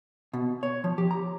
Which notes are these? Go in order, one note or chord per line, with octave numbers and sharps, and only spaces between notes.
B2
C#5
F3
G4
A#5